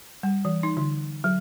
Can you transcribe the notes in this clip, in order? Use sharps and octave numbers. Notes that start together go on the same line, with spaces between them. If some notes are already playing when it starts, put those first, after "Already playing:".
G3
E3
D#4
D3
F#3